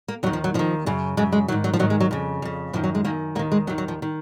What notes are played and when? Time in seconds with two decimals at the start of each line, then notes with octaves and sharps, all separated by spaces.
0.08 A#3
0.23 D#2 F#3
0.26 D#3
0.33 F3
0.44 F#3
0.54 D#2 D#3 F3
0.86 F#2 C#3
1.17 F#2 C#3 G#3
1.32 G#3
1.48 G#2 D#3 F#3
1.64 F#3
1.73 F3
1.79 G#2 D#3 F#3
1.90 G#3
2.00 F#3
2.11 F2 C#3
2.42 F2 C#3
2.73 F#2 D#3 F3
2.84 F#3
2.95 G#3
3.04 F#2 D#3 A#3
3.35 D#2 A#3
3.39 D#3
3.52 G#3
3.67 D#2 D#3 F#3
3.78 F#3
3.88 F3
4.02 D#3